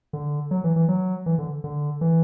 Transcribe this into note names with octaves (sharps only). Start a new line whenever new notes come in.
D3
F#3
E3
E3
F#3
E3
D3
D3
E3